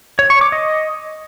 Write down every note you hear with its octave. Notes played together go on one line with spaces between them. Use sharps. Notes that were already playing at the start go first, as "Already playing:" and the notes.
C#5
C#6
D6
D#5